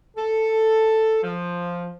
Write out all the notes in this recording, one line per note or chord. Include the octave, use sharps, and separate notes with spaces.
A4
F3